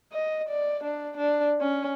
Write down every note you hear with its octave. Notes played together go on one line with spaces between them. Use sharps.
D#5
D5
D4
D4
C#4